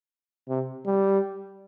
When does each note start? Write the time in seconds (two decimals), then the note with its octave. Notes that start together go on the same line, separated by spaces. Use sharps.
0.49 C3
0.86 G3